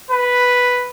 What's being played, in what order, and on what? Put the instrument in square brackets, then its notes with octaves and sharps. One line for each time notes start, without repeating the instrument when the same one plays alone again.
[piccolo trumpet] B4